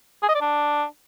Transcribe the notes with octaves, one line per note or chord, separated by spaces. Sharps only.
G#4
D#5
D5
D4